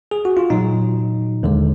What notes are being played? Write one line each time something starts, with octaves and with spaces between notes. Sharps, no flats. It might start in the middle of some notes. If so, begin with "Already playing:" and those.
G#4
F#4
F4
A#2 F#3 D#4
D#2 D3 G#3